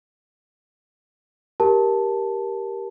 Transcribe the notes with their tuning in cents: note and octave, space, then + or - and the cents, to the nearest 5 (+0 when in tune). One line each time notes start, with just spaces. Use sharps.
G4 +0 A#4 +10 A5 +0